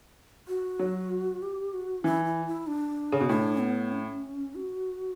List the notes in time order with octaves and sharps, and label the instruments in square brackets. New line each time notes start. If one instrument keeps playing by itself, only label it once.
[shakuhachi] F#4
[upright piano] F#3
[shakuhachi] G4
F#4
[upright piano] E3 [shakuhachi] E4
[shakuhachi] E4
E4
D4
[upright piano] C#3
B2
[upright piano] A2 [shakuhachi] D4
[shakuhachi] B3
C#4
F#4